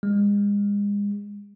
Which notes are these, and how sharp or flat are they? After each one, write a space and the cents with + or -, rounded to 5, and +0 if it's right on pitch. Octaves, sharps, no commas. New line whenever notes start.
G#3 -35